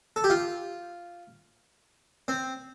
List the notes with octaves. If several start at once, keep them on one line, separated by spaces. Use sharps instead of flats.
A4
G4
F4
C4